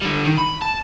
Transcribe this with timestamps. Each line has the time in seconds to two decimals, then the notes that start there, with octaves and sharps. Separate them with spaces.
0.02 D3 G3
0.25 D#3
0.38 B5
0.62 A5